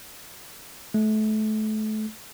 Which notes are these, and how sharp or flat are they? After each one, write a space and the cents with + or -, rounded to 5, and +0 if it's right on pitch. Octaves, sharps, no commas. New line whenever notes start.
A3 -30